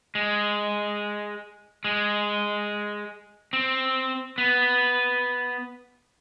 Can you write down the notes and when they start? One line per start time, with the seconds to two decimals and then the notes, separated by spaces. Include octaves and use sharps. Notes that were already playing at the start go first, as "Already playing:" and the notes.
0.15 G#3
1.84 G#3
3.53 C4
4.38 B3